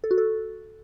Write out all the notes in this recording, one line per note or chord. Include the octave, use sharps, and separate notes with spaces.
A4
F#4
A4